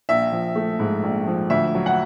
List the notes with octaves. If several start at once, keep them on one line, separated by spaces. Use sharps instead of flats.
A#1 E5
F3
A3
G#2
A#1
F3
D2 E5
F#3
F#5